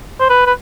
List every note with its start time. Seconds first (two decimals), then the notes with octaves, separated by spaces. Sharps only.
0.20 C5
0.30 B4
0.46 B4